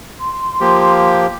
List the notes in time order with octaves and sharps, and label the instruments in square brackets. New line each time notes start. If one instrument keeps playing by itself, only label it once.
[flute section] C6
[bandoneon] F3 A#3 G4